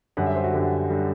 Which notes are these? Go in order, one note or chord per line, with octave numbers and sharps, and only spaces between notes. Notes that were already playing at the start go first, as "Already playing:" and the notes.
F#2 D3 G3 F#5
E5
C5
F#4
F#2 D3 G3 G4
D3 G3